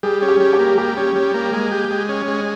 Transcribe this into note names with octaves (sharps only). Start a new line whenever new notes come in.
G3 G#4
C#4
G4
G3
G4
A#3
G3 G4
C#4
G3
A#3
G#3
G4
G#3
C#4
G#3